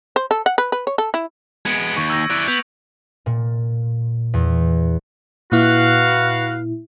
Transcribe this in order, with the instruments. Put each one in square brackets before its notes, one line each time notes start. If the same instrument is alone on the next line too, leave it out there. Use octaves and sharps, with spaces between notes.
[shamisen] C5
A4
F#5
B4
B4
C#5
A4
E4
[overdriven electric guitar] G#3 B3 [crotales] G#6 C#7 D7
[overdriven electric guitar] D#2 [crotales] C#6
[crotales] E6 G6 A#6
[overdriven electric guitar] E4 D5 [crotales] F#6
[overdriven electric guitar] B3 [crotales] G6 F7
[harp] A#2
E2
[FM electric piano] A#2 E4 [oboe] F#4 [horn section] B4 F5